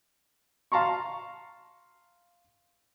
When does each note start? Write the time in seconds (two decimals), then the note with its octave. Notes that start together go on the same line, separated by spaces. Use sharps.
0.72 F5 A5 A#5 C6 C#6